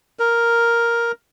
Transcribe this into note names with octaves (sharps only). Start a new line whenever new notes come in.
A#4